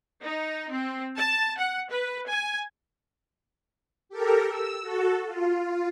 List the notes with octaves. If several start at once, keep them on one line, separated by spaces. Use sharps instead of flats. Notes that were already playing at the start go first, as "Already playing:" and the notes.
D#4
C4
A5
F#5
B4
G#5
G4 A4 A#4
E6
F#4 A4
F4